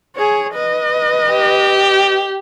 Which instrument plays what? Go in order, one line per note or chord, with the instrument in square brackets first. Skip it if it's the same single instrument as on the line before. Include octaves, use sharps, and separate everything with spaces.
[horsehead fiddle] G#4 C#5
B4 D#5
[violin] G4